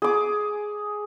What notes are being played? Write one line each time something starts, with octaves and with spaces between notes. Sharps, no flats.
G#4 D6